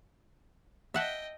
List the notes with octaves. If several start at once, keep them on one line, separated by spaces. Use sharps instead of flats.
D#5 E5 F#5 G5 A5